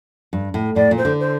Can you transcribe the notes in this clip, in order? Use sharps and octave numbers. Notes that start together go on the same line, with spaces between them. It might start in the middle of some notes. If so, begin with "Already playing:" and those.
G2
A2
A2 D5
A#2
C5
D3
C5